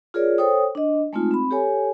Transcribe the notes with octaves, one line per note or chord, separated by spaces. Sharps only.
F4 G#4 A#4 C#5 D5
A4 C5 C#5 G5 D#6
D4 D#5
G#3 A3 C4 D#4 F4
C4 B5
G4 A4 C#5 G#5